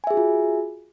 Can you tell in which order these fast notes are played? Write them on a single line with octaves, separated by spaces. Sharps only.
G#5 E5 G#4 F#4 F4